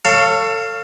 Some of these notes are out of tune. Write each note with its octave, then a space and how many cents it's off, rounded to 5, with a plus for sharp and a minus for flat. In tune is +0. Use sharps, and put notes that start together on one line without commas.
A4 +30 C#5 +0 F5 -5